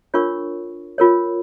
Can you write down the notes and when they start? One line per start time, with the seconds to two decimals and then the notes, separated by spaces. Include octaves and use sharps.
0.14 D4 F4 A#4 C#5 C#6
0.98 F4 A#4 C#5